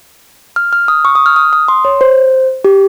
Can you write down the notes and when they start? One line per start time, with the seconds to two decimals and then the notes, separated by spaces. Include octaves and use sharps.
0.56 F6
0.73 F6
0.88 D#6
1.05 C#6
1.15 D#6
1.26 F6
1.36 D#6
1.53 D#6
1.68 C6
1.85 C#5
2.01 C5
2.65 G4